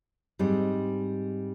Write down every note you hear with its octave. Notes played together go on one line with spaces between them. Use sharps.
G#2 G3 C4 D#4